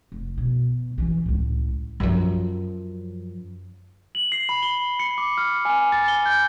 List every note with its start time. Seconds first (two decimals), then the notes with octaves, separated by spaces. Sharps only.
0.12 F1
0.38 B2
0.98 E3 C#4
1.26 C#2 A2
2.00 F#2 F3
4.15 F#7
4.32 C7
4.49 B5
4.63 G7
4.99 C#7
5.18 D6
5.38 F6
5.65 G#5
5.92 A6
6.08 G7
6.26 G6